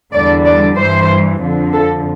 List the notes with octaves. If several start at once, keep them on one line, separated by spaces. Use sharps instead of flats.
E2 D3 G3 D5
D5
G2 E3 G3 C5
F2 D3 F3
A4